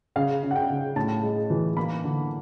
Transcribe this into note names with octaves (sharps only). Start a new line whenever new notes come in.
C#3 F5
C#3
F#5
G5
C#3
A2 A5
G#3
E3
A#3 B5
D3